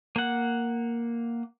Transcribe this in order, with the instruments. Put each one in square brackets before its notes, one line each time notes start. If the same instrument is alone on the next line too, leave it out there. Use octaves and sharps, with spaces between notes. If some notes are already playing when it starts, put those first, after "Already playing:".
[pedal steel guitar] A#3 F#5